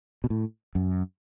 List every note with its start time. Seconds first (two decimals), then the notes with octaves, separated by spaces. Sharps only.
0.24 B2
0.30 A2
0.75 F#2